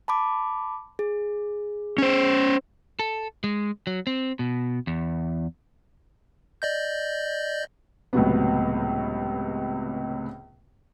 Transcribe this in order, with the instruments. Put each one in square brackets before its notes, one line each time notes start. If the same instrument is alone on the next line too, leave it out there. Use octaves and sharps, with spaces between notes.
[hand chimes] A5 B5 D6
G#4
[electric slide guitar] C#4 C5
A4
G#3
F#3
C4
B2
E2
[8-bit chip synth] D5 D#5 G6
[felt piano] C#2 A2 C3 F#3 B3